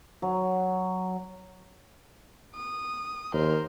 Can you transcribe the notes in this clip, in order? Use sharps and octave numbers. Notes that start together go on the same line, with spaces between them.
F#3
D#6
D#2 A#4 C5